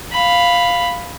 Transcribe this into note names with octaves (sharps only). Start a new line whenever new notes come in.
F5 B5